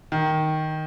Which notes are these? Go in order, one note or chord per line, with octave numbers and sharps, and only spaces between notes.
D#3